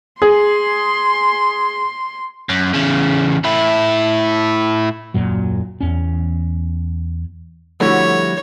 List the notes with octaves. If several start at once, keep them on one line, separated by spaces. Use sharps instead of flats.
G#4 C6
F#2
E2 C#3
A2 E4
D#1 F#2 A#2 F#3
E2 C#4
D3 F3 G3 A3 E4 F#4 C#5